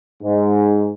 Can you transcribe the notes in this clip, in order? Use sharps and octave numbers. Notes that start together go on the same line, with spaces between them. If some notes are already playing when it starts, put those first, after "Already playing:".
G#2